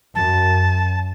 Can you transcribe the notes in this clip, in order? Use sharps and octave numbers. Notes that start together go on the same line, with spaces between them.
F#2 A5